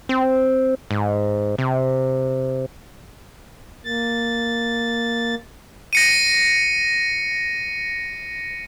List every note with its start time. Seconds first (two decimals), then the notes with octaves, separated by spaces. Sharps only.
0.09 C4
0.91 G#2
1.58 C3
3.85 A#3 A6
5.93 A#6 C#7 D#7